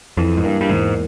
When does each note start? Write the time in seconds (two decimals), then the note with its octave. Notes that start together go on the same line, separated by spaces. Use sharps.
0.17 F2 E3
0.37 G#2
0.44 G2 A#3
0.61 G2
0.70 E2 G#2